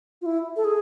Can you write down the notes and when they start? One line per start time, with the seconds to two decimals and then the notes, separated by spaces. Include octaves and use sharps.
0.22 F4
0.26 E4
0.56 A4
0.64 G#4